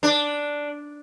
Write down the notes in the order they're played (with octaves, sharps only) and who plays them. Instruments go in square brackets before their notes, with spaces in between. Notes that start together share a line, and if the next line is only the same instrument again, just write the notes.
[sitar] D4